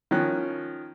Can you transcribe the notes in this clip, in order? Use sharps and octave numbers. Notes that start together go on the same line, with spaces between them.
D#3 F3 C#4 F#6